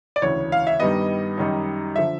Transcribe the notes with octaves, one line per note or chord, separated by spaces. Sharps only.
D5
E1 D2 C#3 E3 C#5
F5
E5
G2 D#3 G3 B3 D#5
F#2 D#3 G3
D3 F3 E5